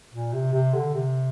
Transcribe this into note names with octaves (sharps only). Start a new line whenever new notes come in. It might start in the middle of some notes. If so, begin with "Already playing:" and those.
A#2
C3
C3
D3
C3